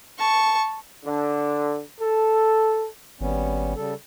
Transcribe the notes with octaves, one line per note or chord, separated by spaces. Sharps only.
A5 C#6
D3
A4
G#1 G3 B3 C#4
C#3 G3 A4